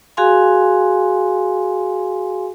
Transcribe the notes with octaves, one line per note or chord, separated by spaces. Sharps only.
F#4 G#4 F5 G#5 C6